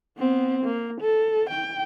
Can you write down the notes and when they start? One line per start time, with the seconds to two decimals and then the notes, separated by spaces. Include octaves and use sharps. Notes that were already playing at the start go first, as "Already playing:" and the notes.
0.18 B3 C4
0.64 A#3
1.01 A4
1.50 G5